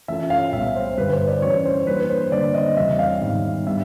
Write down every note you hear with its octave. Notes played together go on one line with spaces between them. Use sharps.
E3 A3 C#4 F4 A4 E5
F5
C2 A#2 G3 B3 E5
C5
G2 D3 G3 B4
C5
D5
E3 A3 C#4 F#4 C#5
C5
E3 G3 A#3 D4 B4
C5
D3 G3 A#3 D4 D5
D#5
E2 C#3 E3 G3 C4 E5
F5
G#2 D#3 G3 B3 D#4
G3 B3 D4 E5